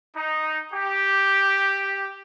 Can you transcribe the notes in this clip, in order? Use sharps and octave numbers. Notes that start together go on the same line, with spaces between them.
D#4
G4